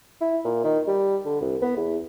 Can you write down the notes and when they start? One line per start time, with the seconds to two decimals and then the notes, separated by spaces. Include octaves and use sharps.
0.21 E4
0.45 A#2
0.64 D#3
0.87 G3
1.26 D3
1.41 C2
1.62 B3
1.77 E2